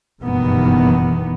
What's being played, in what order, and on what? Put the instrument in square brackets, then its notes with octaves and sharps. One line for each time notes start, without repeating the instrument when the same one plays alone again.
[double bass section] F#1 G2 B2 D#3 E3 B3